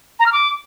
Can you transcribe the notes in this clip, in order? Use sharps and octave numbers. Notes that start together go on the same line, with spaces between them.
A#5
F6
D6